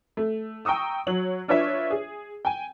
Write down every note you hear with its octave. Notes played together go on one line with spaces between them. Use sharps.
A3
G5 A#5 C#6 D#6 E6
F#3 C#5 F#7
D4 F4 B4 C#5 D5 E5
G#4
G5 G#5